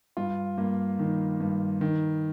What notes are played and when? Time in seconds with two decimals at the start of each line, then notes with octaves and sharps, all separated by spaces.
0.17 G2 F4
0.58 G2 A#3
0.99 D#3
1.40 G2
1.81 D#3